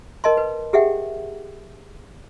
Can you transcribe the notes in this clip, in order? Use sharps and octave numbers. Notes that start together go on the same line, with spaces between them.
A#4 D#5 A5 C6
B4
G4 G#4 E5 F#5 G5